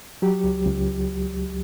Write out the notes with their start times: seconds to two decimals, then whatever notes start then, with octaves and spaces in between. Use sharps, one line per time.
0.22 F#3 G4
0.44 C#2
0.65 C#2